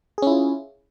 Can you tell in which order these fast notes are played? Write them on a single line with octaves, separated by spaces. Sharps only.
G#4 C#4 E4 F4